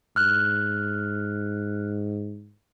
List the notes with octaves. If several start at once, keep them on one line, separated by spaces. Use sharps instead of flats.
G#2 F6 F#6